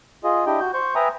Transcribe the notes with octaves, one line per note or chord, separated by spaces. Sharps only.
F4 G#4 D#5
D4 E4 G4 D#5 G5
F#4 G6
C5 C#6 G6
B4 E5 G5 G#5 A#5 D#6